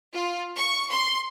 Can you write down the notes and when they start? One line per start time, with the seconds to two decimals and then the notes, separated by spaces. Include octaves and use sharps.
0.13 F4
0.56 C#6
0.90 C6